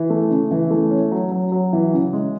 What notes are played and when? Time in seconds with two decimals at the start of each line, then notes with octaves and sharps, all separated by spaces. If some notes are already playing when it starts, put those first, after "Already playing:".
Already playing: E3
0.10 A3
0.31 C#3
0.51 E3
0.71 A3
0.91 C#4
1.12 F#3
1.32 F#3
1.52 F#3
1.73 E3
1.93 C#3
2.13 G#3